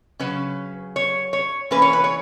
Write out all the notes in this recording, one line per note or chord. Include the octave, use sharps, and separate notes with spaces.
C#3 F#3 C#4 B4
C#5
C#5
E3 A#3 C#4 B4
C#5
B4
C#5